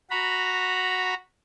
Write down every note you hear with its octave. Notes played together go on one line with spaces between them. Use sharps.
F#4 A#5 B5